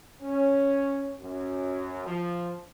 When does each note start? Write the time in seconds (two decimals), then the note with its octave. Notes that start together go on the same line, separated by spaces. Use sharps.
0.22 C#4
1.21 F#2
2.06 F3